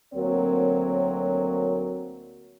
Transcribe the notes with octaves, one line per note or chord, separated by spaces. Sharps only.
D2 F#3 A#3 C4 A#4 C#5